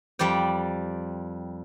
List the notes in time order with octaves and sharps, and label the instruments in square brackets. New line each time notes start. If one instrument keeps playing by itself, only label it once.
[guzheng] F2 G3 D5 G5